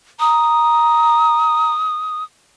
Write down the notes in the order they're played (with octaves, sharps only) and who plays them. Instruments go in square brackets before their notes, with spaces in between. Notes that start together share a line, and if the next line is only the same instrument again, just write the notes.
[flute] A#5 [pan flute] D#6